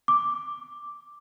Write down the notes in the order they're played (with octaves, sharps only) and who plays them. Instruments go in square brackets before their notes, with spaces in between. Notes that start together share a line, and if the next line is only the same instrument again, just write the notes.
[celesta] D6